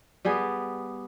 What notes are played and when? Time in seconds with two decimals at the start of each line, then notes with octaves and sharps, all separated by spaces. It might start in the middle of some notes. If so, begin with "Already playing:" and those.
0.25 G3 B3 G#4